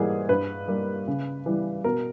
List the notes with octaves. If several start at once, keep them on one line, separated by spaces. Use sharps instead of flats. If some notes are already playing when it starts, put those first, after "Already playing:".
Already playing: G#2 E3 G3 A#3 G#4
G2 B4
G3 A#3
C#3
E3 G3
B2 A#4